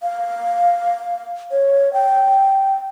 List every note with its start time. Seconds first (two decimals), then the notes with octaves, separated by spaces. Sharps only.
0.03 F5
1.51 C#5
1.93 G5